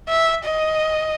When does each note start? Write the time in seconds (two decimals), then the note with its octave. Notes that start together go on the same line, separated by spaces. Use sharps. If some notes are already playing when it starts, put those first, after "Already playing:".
0.09 E5
0.45 D#5